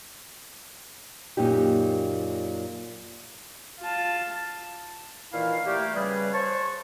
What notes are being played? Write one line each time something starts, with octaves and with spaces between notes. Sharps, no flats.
F#2 A#2 D#4 G4
F4 A5
A#2 D#3 E3 E4 F5
G3 A3 A#3 G4
C#3 G3 G#4 B4
C5 C#5 A5 C#6